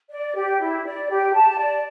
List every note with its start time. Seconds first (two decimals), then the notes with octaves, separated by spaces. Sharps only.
0.10 D5
0.35 G4
0.61 E4
0.85 D5
1.10 G4
1.34 A5
1.58 D5